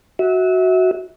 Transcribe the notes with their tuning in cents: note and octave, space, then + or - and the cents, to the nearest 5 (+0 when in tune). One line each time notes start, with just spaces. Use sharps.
F#4 +0 E5 -30